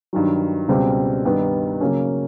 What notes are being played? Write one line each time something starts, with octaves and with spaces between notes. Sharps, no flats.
G2 D#3 F#3
C#2 B2 G3 C4
G2 D#3 G3 B3 D#4
C#3 F#3 A#3 C#4